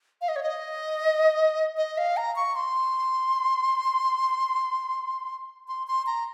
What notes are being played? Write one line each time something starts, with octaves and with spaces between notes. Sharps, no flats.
F5
D#5
C#5
D#5
D#5
F5
A#5
C#6
C6
C6
C6
A#5